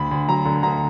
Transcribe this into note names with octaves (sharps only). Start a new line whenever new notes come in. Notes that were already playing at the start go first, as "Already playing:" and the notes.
Already playing: D2 B5
D2
F#3 A#5
D3
D2 A#5